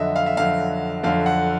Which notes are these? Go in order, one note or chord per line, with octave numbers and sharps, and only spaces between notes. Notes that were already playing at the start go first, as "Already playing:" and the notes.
Already playing: F2 D3 F#3 D#5 E5
F5
E5
F2 D3 F#3 F5
F2 D3 F#3 F5
F#5